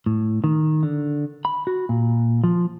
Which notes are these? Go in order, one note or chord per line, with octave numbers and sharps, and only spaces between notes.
A2
D#3
D3
B5
F#4
A#2
F3